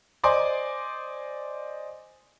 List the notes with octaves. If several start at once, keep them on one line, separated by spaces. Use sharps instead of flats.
C5 D5 D#5 G#5 C6 D6